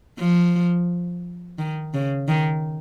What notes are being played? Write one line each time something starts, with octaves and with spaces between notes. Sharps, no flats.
F3
D#3
C#3
D#3